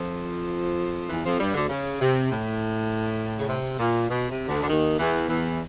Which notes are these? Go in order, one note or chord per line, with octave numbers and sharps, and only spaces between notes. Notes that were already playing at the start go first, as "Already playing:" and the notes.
Already playing: F2 F3
E2 E3
F2 F3
G2 G3
D2 D3
C#3
C3
A2
C#3
C3
A#2
B2
C3
D2 D3
D3
D#2 D#3
E2 E3
E2 E3